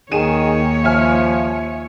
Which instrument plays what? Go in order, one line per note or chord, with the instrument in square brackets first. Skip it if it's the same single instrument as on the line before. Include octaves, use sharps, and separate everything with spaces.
[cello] D#2 C#5 [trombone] D#3 [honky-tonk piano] G#4 D#7 E7
[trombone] F3 [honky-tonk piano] E5 G#5 F6